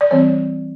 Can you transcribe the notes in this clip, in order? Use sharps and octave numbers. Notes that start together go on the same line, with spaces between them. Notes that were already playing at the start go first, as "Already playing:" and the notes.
D5
E3 G3 C4 C#5